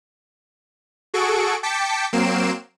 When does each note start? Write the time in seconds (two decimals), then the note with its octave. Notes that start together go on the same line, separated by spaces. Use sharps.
1.14 F#4 G#4 A4 C#6 D7
1.63 G5 A5 D6 B6 C#7
2.13 F#3 A#3 C4 C7 D7 E7